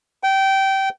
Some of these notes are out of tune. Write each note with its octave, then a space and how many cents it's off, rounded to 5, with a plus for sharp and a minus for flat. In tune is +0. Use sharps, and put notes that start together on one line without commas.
G5 -20